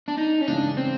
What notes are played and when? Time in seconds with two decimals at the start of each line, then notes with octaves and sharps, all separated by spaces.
0.08 D4
0.18 D#4
0.41 C#4
0.48 C#3 E3 G#3 D4
0.77 C4